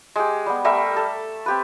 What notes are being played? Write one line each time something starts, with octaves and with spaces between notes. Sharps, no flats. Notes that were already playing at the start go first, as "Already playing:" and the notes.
G#3 G4
G3 B3
G3 A3 A#4 E5
A4
C4 G4 B4